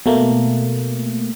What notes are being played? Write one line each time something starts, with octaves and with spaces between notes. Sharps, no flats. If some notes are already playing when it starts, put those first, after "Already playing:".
B2 A3 A#3